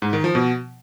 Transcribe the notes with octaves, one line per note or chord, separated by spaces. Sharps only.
G#2
D#3
F3
B2